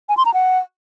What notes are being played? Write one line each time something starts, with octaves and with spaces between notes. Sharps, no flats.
G#5
C6
A#5
F#5